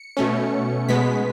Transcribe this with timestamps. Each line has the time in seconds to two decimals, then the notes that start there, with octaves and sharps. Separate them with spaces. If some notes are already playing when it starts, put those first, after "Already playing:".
Already playing: C#7
0.17 B2 A3 C#4
0.88 B2 G#3 B3 B6